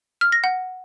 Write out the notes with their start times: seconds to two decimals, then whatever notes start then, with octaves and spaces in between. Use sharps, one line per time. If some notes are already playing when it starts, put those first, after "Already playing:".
0.21 F6
0.32 A#6
0.44 F#5